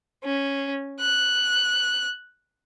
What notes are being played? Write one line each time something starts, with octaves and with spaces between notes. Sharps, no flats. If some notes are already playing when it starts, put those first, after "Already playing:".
C#4
F#6